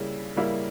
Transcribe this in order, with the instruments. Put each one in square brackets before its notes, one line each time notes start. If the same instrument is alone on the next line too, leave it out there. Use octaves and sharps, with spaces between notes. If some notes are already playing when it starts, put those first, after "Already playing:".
Already playing: [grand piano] C#3 G3 A#3 E4
C#3 G3 A#3 E4